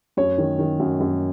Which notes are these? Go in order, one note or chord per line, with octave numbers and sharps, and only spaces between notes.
F#2 C#5
D#3
D#3
F#2
F#2